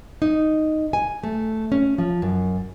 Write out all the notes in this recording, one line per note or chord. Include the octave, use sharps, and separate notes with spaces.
D#4
G#5
A3
C#4
F3
F#2